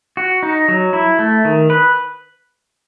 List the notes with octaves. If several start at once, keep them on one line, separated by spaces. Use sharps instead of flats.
F#4
D#4
F#3
E4
A3
D#3
B4